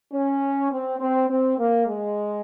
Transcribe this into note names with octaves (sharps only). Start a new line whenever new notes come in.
C#4
C4
C4
C4
A#3
G#3